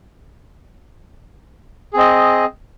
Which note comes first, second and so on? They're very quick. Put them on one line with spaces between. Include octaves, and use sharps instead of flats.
G#4 C4 D#5